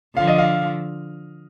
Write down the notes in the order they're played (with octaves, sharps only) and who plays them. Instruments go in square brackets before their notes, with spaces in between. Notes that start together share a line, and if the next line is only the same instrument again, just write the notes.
[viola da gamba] D3 F3 [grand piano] F5
[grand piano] D#5
F5